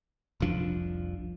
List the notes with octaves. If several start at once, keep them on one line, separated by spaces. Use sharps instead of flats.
F1 C2 F3 D4